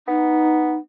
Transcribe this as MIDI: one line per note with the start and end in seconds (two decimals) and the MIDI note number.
0.08 0.75 59
0.08 0.76 63